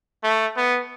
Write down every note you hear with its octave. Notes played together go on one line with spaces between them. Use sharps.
A3
B3